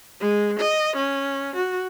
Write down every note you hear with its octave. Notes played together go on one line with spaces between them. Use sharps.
G#3
D#5
C#4
F#4